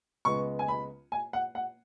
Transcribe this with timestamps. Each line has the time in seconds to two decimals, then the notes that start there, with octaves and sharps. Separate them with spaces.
0.25 C#2 C#3 G#3 B3 C#6
0.59 G#5
0.68 B5
1.12 G#5
1.33 F#5
1.55 F#5